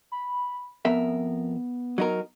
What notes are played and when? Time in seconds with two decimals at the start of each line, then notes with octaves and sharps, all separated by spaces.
0.12 B5
0.85 F2 B3 A#4 E5
1.98 F#3 D#4 A#4